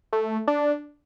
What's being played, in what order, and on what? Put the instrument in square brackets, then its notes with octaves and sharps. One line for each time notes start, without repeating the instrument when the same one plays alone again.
[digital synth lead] A3
D4